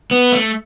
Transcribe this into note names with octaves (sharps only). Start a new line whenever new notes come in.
B3
A3